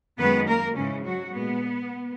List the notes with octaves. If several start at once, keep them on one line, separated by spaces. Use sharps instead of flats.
F#2 D#3 G#3 B3 B4
A#3 A#4
G#2 C#3 E3 G#3 C#4
F#3 F#4
A#2 G#3 B3